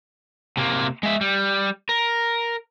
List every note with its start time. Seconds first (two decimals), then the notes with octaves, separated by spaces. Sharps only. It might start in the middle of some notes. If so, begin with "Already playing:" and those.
0.57 C3 A#3
1.03 G#3 E5
1.21 G3
1.89 A#4